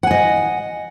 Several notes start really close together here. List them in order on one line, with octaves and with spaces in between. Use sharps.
F#5 G#5 D#5